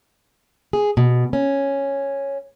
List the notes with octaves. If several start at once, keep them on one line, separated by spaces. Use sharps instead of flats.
G#4
B2
C#4